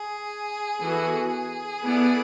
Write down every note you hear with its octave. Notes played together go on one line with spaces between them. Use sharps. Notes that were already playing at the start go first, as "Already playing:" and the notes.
Already playing: G#4
E3 B3 F#4 A4
G#4
B3 E4 A4 D5